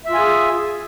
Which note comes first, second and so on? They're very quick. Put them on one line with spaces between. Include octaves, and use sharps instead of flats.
E5 F4 G#5 G#4